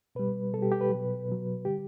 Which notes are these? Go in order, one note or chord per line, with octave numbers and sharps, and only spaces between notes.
B2 G3 B4
B2 G3 G4 A4
G4
B4
F#3
B2
B2 F#3
D3 G3 G4